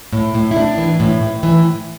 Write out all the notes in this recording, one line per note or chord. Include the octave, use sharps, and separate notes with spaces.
A2
A2
E4
A2 D4
E3
A2
A2
E3